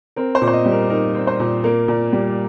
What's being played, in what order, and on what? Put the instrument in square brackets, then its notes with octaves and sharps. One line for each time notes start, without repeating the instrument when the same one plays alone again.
[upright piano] C4 A#4
C5
A#2
C5
D#5
G3
A#4
D#4 A#4
C4
C5
A#2
A#3 A#4
A#2
G3